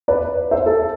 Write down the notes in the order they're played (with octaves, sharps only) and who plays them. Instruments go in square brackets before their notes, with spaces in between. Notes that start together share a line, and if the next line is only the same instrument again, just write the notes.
[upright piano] B4 D5
C5 E5
A4